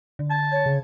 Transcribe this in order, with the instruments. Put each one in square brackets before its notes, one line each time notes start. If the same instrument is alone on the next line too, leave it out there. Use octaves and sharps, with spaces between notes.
[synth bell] D3
[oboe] A5 [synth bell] G#6
[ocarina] C#5 [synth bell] G#6
[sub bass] C#3